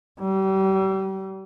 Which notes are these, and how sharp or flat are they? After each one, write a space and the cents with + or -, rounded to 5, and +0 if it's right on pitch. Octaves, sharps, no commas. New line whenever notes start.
G3 -35